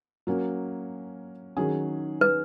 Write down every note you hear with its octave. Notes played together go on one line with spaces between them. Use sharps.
F#3 A#3 C#4
D#3 F#3 C#4 G#4
B4